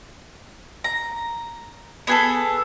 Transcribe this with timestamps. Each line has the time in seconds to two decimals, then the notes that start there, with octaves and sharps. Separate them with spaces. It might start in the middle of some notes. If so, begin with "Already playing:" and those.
0.84 A#5
2.07 B3 G#4 A4